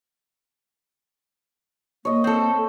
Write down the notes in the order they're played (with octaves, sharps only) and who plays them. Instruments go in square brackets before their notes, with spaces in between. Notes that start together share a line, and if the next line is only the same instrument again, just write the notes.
[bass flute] A#3 [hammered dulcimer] C#5 D#5
[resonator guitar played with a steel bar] C4 A4